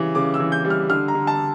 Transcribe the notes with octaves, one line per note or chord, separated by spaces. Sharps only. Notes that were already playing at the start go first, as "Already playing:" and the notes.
Already playing: C#3 E3 G3
C#3 D6
E6
E3
G6
G3
F6
D3 F6
A#5
D3
A5